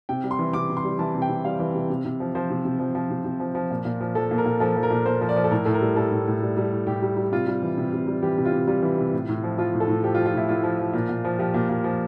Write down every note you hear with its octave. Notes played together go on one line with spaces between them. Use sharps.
C3 G5
G3
C6
E3
C3 D6
C3
C6
G3
E3 A5
C3
G5
C3
G3 F5
E3
C3
C3
C3
F3
F3 C5
C3
C3
F3
F3
C3
C3
F3
F3
A#2
A#2
F3
F3 A4
A#2
A#4
A#2
F3 A4
F3
A#4
A#2
A#2 C5
F3
D5
F3
A4
A2 A#4
A2 A4
A#4
G3
G3 A4
A2
A2
G3
G3
A2
A2 G4
G3
G3
C3 F4
G3
E3
C3
C3
G3
E3 G4
C3
F4
C3
G3 F4
E3
C3
A2
A2
F3
F3 F4
A2
A4
A2
F3 G4
F4
F3
F4
A2 E4
A2 F4
F3
F3
A#2
A#2
F3
F3 G4
A#2
A#2
F3